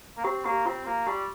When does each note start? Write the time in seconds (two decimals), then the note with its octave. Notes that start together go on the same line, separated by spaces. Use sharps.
0.17 A#3
0.24 C4 G4
0.45 A#3 G4
0.66 C4 F4
0.86 A#3 F4
1.07 G3 G4